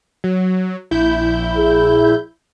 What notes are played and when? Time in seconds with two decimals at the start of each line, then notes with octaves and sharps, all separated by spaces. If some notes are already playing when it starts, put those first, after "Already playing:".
0.24 F#3
0.91 A#1 E4 G6
1.57 G#4